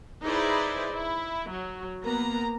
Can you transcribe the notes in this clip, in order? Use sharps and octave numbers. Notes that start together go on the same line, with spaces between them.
D#4 E4 G#4 B4 C5 D5
E4
F#3
A#3 B3 A#5